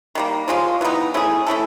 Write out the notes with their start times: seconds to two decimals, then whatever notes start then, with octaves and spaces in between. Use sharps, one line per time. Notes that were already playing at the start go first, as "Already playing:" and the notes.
0.15 D#3 G3 A#3
0.48 F3 G#3 C#4 F4
0.81 E3 G3 B3 D#4
1.14 A3 C#4 E4 G#4
1.46 A3 C#4 E4 A4